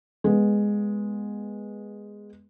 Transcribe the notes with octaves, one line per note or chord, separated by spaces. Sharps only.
G#3 B3